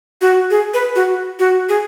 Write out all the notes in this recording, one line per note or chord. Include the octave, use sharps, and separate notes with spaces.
F#4
G#4
B4
F#4
F#4
G#4